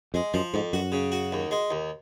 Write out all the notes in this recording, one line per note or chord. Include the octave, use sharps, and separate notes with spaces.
F2 G#3
F#2 F3
F2 G#2
F#2 F#4
C#3
F#4
D#2
G#3
D#2